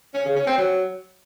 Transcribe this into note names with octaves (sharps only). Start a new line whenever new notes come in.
C#4
C#3
C#4
C4
F#3